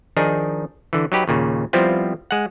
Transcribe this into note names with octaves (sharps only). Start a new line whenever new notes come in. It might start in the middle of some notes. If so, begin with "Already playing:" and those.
D#3 F3 D4 D#4 G#4
D3 E3
F#3 D#4 G4 B4
D#2 A#2 C#3
F3 G3 B3 C4 E4 F4
G#3 F#5